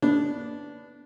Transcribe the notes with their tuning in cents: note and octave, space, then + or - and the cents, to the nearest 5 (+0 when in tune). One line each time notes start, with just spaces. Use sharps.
B3 +5 D4 -10